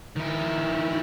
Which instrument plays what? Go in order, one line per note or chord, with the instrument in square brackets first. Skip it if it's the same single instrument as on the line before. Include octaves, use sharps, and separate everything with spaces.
[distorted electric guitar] D#3 E4